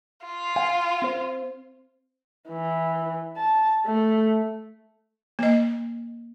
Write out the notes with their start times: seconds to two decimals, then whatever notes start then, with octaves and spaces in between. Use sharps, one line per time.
0.25 F4
0.56 F5 F#5 G#5
1.02 C4 C5
2.49 E3
3.37 A5
3.86 A3
5.39 A#3 D#5